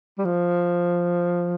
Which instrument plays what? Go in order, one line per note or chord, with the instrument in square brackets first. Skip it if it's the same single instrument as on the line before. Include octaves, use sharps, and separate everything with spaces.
[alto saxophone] G3
F3